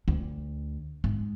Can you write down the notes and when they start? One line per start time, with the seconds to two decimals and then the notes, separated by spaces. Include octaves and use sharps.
0.08 D2
1.04 G#2